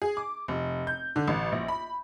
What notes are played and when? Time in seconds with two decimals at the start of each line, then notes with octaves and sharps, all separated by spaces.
0.02 G#4
0.17 D6
0.48 F1
0.87 G6
1.16 D3
1.28 A1
1.52 A#1
1.68 B5